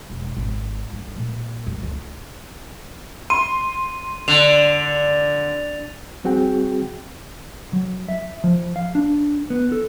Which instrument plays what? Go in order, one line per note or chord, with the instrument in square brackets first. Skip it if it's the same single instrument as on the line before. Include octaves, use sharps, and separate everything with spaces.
[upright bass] E1
G#1
G1
A#2
F#2
D2
[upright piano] C6 [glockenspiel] D#7
[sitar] D3 [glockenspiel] F7
[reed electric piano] G3 C4 F#4 G#4 G5
[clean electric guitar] F#3
E5
F3
F5
D4
B3
A4